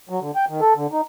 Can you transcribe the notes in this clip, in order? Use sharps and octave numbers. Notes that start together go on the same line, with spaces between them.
F#3
D3
G5
D#3
A4
D3
D#4